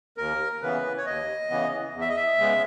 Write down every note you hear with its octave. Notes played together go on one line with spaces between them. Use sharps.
D#2 A#4
C#3 E3 B3 B4
C#5
D#2 D#5
C#3 E3 B3
E2
E5
D#5
E5
C#3 G#3 B3